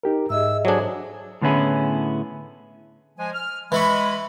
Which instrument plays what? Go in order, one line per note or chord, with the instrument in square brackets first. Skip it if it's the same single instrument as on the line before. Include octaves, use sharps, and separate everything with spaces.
[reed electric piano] D#4 G4 A#4
[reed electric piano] G#2 [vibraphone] G#4 D#5 E5 [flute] E6
[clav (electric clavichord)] F#3 D4 [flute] G#4 [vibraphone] A4 C5
[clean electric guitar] A2 D3 B3 C#4 E4 G#4
[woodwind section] F3 G#3 G#5
F6
[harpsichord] E3 E4 C#6 [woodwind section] G#3 B5